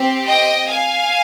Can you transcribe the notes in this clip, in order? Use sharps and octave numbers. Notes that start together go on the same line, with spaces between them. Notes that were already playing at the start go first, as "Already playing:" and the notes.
Already playing: C4 G4
D#5 G5
F5 G#5